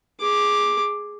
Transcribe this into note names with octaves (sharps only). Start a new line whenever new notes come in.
G#4 D6